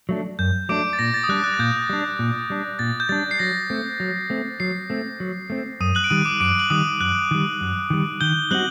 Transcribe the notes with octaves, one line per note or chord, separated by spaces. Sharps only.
F#3 A3 D4
F#2 G6
F#3 A3 D4 D6 D7
A6
A#2 A#6
A6
D#6
G3 D4 F#6
F#6
A6
A#2 G6
G3 D4
A#2
G3 D4
A#2 A6
G6
G3 D4 A6
C7
F#3 A#6
A3 C4
F#3
A3 C4
F#3 C7
A3 C4
F#3
A3 C4
F#2 D#6 D#7
F#6 F#7
D7
D#3 G3 D#6 D#7
D6 D7
F#2 D6 D7
F#7
D#3 G3 D#6 D#7
F#2 F#6 F#7
D#3 G3
F#2
D#3 G3
D#3 G6 G7
G3 C4 D#4 F#4 F#6 F#7